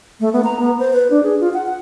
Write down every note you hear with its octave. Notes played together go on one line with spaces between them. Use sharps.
A3
B3
A#5
B3
C5
B4
D4
G#4
F4
F#5
F#5